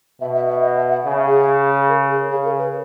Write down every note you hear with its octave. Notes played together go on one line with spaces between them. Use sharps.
B2 E5
E5
E5
D#5
E5
F#5
C#3 E5
G#4
A#4
G#4
C#3 G#4
A#4
B4